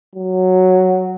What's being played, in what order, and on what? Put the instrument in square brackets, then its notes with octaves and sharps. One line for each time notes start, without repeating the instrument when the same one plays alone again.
[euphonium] F#3